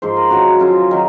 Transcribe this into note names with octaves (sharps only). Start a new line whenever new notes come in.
G#2 F3 C5
A#4
F#2 D#3 F#3 F#4
F#2 C#3 F3 F4
D#3 F#3